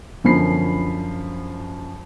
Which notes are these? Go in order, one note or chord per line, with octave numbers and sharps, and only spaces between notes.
F#2 D3 F3 B5 C7